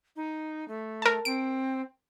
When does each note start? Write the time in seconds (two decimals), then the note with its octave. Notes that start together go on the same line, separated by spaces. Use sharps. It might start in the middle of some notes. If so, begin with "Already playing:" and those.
0.16 D#4
0.68 A3
1.02 A#4 A5
1.25 C4 D7